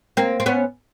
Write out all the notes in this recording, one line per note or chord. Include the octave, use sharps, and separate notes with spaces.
A#3 C4
C4
B3 C#4